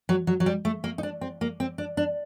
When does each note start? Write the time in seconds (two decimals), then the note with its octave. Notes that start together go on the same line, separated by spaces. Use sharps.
0.09 F#3
0.27 F#3
0.40 F#3
0.46 G3
0.65 A3
0.84 A#3
0.98 D#4
1.03 D4
1.21 C4
1.41 A#3
1.60 C4
1.78 D4
1.97 D4